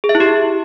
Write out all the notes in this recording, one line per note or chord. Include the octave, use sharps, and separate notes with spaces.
G#4
E5
E4
G4